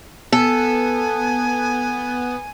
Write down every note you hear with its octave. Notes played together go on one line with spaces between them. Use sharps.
B3 A4 G#5